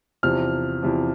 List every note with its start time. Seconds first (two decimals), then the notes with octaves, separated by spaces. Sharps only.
0.23 E2 C3 F3 F6
0.83 E2 C3 F3